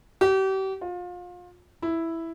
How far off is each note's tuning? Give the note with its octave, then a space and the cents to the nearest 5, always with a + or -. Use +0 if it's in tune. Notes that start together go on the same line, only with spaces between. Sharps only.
G4 -35
F4 +30
E4 +0